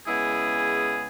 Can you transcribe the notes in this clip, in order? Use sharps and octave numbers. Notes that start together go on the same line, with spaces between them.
C#3 G#3 B3 E4 G#4